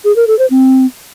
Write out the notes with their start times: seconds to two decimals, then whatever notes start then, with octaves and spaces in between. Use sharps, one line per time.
0.05 G#4
0.16 A#4
0.27 A4
0.39 C5
0.50 C4